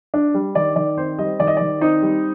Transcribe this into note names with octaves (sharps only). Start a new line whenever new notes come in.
D4
G3
D#3 D5
D#3 D5
C4 C5
G3 D#5
D#3 D5
D#5
D#3 D5
C4 D#4
G3